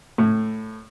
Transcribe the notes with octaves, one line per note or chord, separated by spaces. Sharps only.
A2